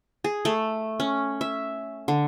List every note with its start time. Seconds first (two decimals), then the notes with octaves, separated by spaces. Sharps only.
0.24 G#4
0.45 A3
1.00 C#4
1.41 E5
2.08 D3